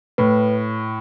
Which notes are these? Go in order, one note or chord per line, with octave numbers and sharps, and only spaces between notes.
A2 B4